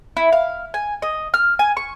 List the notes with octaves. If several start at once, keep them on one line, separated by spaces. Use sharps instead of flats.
E4
F5
G#5
D#5
F6
G#5
C#6